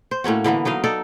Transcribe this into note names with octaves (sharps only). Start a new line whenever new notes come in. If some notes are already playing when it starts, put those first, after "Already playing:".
C5
A2 A#3 C#4 F#4
D3 E3 A#3 B3
F#3 D#4 D#5 F5
D#4 A4 D5